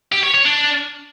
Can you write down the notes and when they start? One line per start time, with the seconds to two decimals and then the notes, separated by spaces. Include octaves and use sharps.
0.12 G4
0.23 C#5
0.34 C#5
0.45 D4